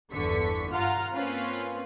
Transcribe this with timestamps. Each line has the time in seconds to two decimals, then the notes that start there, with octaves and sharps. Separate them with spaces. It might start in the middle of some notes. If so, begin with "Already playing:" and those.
0.12 G1 E2 D3 C#6 B6
0.72 G2 F4 F#5 A#5 F6
1.14 A#3 C4 C#4 F4 B4